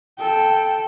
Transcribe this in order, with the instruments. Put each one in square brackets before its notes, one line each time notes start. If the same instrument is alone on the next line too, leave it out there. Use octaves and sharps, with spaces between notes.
[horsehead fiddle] A4 G5